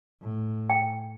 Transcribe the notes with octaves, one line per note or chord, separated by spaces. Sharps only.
A2
G5